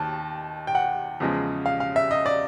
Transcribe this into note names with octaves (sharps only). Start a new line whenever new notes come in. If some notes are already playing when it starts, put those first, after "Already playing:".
Already playing: D#2 D#3 A5
G5
F#5
E2 C#3 F3 G#3
F5
F5
E5
D#5
D5